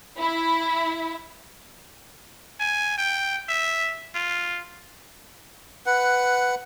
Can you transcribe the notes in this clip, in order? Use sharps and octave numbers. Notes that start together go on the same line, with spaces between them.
E4
G#5
G5
E5
F4
B4 F#5